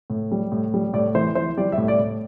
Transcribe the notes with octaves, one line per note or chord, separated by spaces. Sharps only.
A2
G3
A2
G3
A2 D5
E3 C5
E3 C5
G3 D5
E5
A2
D5
A2